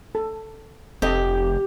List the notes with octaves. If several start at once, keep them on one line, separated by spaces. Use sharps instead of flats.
A4
F1 C4 G4 A4 D#5